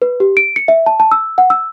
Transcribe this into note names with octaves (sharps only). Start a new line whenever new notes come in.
B4
G4
D7
C#7
E5
A5
A5
E6
F#5
E6